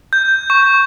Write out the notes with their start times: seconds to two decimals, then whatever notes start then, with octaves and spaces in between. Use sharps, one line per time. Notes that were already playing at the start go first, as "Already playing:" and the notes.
0.13 G6
0.50 C#6